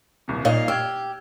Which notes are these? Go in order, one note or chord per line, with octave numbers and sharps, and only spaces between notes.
D#1 C2 C3
A#2 D#4 C#5 D#5 F5
G4 E6 F6 G#6